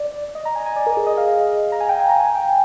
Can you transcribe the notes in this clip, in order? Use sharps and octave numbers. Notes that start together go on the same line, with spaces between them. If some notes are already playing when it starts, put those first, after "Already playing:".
Already playing: D5
D#5
A#5
G#5
G#5
D5
A#4
G#4
D#5
F5
A#5
G#5
G5
G#5
A#5
G#5
G5